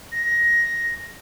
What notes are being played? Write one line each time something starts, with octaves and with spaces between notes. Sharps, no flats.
A#6